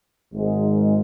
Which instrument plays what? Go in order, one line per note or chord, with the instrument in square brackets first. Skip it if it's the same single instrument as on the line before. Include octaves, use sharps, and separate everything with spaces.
[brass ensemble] G#1 G#2 G#3